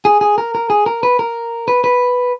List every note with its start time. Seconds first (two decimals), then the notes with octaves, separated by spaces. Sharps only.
0.05 G#4
0.21 G#4
0.38 A#4
0.55 A#4
0.70 G#4
0.86 A#4
1.03 B4
1.19 A#4
1.68 B4
1.84 B4